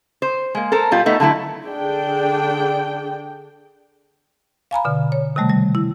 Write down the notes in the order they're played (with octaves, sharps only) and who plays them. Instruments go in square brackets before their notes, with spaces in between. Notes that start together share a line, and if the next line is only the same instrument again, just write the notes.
[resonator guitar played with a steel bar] C5
G#3 A#3
A4 A#4 C5
B2 G3 F4
A3 B3 D#4
D3 F#3 A3 E4
[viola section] D3 D4 G#4 G5
[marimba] F5 G#5 A#5 B5
B2 D3
C#5
C3 D#3 G3 A3
G3
E4